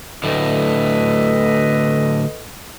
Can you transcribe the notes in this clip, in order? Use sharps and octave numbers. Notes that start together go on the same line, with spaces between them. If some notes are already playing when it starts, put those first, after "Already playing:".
D2 A2 A4 B4 D#5